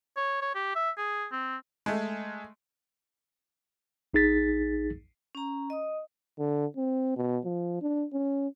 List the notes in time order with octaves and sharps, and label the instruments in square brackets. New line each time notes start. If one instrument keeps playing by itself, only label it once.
[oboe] C#5
C#5
G4
E5
G#4
C4
[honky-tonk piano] G#3 A3
[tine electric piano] A#1 D#4 G#4 A6 B6
[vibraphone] C#4 A#5
D#5 D#6
[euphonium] D3
C4
B2
F3
D4
C#4